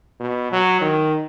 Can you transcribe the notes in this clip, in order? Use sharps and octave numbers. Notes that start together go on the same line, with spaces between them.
B2
F#3
D#3